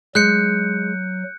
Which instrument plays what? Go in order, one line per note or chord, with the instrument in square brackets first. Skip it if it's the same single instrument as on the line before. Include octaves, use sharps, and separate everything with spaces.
[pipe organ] F#3 [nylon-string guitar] G#3 [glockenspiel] F#6 G6 C#7